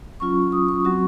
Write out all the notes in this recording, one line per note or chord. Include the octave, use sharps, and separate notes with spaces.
F#3 C#4 F4 C#6
D#6
C#6
F#3 C4 F#4 C#6